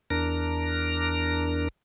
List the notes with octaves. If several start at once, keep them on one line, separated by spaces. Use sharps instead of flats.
E2 D4 A#4 A#5